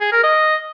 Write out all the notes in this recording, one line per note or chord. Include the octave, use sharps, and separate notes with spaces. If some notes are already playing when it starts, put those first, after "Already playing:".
G#4
A#4
D#5